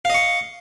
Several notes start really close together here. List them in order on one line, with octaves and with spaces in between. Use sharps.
F5 D#5 C#6